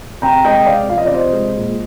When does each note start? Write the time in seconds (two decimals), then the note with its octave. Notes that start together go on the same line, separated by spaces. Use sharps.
0.22 C3 G5 A#5
0.44 G#3 D#5 G5
0.66 C3 D5 F5
0.89 F3 F5
0.98 D#5
1.06 D5
1.11 C3 C5 D#5
1.33 G#3
1.56 A#2